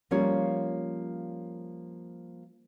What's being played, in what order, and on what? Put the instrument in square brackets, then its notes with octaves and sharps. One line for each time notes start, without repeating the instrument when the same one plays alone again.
[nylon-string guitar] F3 G3 A#3 C#4 F4 C#5